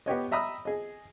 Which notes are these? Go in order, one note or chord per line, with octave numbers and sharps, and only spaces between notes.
B3 G4 C#5 D#5
D#5 E5 A#5 B5 D#6 E6
G#4 D#5